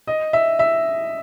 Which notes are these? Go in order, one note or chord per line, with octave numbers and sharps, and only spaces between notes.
D#5
E5
E5